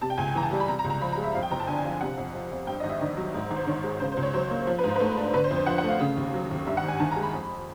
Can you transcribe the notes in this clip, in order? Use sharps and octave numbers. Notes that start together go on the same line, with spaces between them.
C3 A5
G5
C#2 G#5
E3 A#5
A5
G3
B5
C3 A#5
A#5
C#2
A#5
F3 B5
A#5
G#3
E5
F2 F5
G5
F#1 A#5
A5
D3 G#5
G#5
F3
C3 F#5
F2
F3
F2
G2 G5
G#1 D#5
E5
D#3 D5
F#3
G#2
G#1
C5
D#3 C#5
G#3
C#3 C5
C5
C#2
C#5
F#3 C5
A#3
F3
B4
G#2
C5
B4
A3 C5
D4
D3 B4
C5
F2
C5
F3 F#5
F#5
A3 F5
C#3
D#2
F#3
D#2
G2 E5
F#5
G#1
G#5
D#3 A5
A#5
G#3
B5
F2